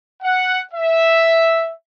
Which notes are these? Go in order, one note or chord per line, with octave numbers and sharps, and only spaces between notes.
F#5
E5